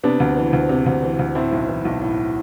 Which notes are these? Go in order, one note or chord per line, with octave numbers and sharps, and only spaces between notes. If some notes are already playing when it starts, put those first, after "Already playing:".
C3 B3 D4
D2
E3
D2
C3
D2
E3
D2
A2 C4 E4
B1
E3
B1
A2